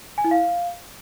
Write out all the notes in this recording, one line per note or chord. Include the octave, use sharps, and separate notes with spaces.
G#5
E4
F5